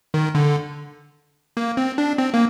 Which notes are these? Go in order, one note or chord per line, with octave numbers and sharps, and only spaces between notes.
D#3
D3
A#3
C4
D4
C4
A#3